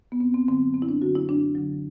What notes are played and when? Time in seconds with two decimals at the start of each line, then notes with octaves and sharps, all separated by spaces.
0.12 B3
0.20 F#2 C4
0.34 C4
0.47 D3 C4
0.52 F#3
0.74 F#2 C4
0.82 E4
0.89 D4
1.02 D3 F#3 F#4
1.15 E4
1.29 F#2 D4
1.55 D3 F#3